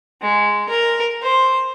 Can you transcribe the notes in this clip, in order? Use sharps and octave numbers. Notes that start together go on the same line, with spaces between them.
G#3
A#4
C5